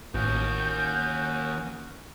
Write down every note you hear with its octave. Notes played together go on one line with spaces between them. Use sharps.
A1 D#2 C#4 F#4 D#6 G6